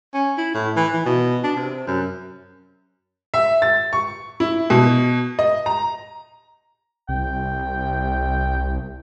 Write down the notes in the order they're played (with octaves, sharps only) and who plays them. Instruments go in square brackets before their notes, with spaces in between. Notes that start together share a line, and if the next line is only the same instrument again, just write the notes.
[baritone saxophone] C#4
E4
A2
E3
E3
B2
D4
C3
F#2
[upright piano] E5
A6
C#6
E4
B2
D#5
A#5
[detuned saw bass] C2 [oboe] G5